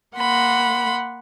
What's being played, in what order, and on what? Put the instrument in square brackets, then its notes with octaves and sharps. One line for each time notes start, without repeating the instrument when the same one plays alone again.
[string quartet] A#3 F#5 B5 C6